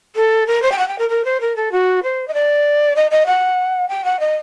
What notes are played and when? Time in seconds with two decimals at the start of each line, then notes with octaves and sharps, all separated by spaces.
0.15 A4
0.46 A#4
0.62 C5
0.71 G5
0.78 F#5
0.87 G5
0.98 A#4
1.09 A#4
1.24 C5
1.40 A#4
1.55 A4
1.71 F#4
2.02 C5
2.27 D#5
2.33 D5
2.95 D#5
3.10 D#5
3.26 F#5
3.88 G5
4.04 F#5
4.19 D#5